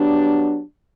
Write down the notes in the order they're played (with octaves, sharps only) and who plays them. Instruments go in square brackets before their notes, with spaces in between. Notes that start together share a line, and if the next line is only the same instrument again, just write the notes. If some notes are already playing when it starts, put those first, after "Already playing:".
Already playing: [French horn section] F#3 B3 D4 G4